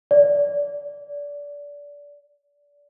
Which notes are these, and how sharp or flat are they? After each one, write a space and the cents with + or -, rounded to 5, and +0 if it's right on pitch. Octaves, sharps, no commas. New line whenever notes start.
D5 -25